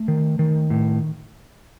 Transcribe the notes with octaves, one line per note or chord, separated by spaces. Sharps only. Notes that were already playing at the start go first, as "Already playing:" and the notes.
Already playing: A3
D#3
D#3
A2